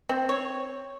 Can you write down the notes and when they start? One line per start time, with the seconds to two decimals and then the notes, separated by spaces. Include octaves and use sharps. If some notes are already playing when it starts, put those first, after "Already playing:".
0.09 C4
0.29 C#5